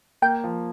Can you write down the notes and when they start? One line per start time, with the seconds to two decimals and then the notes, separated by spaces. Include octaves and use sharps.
0.22 A#3 G5
0.44 F3